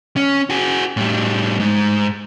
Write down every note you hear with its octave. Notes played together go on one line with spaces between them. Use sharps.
C#4
F#4 G#4
A2 G3
G#2